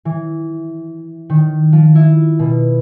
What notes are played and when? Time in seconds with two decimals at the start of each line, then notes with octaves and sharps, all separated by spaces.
0.05 E3
1.30 D#3
1.73 F3
1.95 E4
2.39 B2